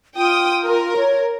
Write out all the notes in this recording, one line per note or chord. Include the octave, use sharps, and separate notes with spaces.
F4 G5 D#6
A#4
C#5